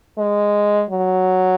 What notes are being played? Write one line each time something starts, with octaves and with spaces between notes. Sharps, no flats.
G#3
F#3